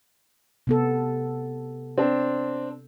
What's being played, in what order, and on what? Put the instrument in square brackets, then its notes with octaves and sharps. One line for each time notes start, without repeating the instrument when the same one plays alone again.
[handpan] C3 B3 A4
[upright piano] C4 D4